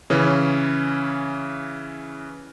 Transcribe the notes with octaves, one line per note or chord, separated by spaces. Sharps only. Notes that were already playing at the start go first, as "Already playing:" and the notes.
C#3 E3 C#4